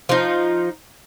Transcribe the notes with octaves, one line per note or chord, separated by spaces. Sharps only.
F3 D#4